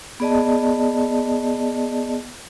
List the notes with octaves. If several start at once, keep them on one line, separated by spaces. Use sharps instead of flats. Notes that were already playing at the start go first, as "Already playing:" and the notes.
B3 G#4 D5 D#5 A5